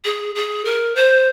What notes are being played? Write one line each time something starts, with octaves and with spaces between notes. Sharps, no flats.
G#4
G#4
A#4
C5